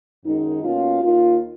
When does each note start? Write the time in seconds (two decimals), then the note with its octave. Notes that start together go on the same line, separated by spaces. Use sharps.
0.25 F#2 D#3 G#3 D#4
0.64 B2 A#3 C#4 F4
1.03 D#2 D#3 A#3 F4